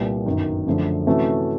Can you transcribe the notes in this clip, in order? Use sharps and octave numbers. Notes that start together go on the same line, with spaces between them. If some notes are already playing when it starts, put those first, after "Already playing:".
Already playing: C2 A#2 G3 B3
G1 F#2 D#3
F#2 D3 F3 A3 D4
C3 E3 A3 C#4 F#4